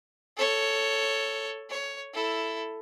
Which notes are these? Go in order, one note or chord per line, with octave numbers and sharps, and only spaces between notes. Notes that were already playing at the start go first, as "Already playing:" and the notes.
A4 C#5
C#5
E4 A4